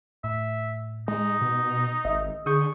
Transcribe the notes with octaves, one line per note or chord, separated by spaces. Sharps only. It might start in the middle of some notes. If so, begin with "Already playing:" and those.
A2 E5
G#3 D#4
B2
G#1 D#5 E5
D3 G#4 C#6 D#6 G6